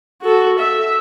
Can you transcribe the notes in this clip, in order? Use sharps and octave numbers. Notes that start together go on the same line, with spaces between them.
F#4 A4
E5